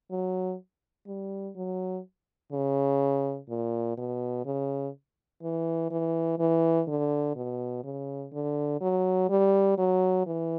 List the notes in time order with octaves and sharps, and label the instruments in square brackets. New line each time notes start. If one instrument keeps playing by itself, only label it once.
[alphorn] F#3
G3
F#3
C#3
A#2
B2
C#3
E3
E3
E3
D3
B2
C#3
D3
F#3
G3
F#3
E3